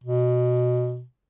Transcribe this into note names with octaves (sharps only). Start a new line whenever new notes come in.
B2